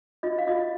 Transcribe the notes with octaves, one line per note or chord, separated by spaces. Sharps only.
F4 D#5
F5
F4 D#5